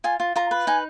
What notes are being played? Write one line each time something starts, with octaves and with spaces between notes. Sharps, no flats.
F4 G#5
F4
F4 A#5
B4
D#4 G#5